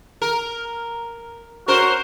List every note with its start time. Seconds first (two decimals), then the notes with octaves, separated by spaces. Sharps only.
0.22 A#4
1.68 C#4 F#4 A#4 C5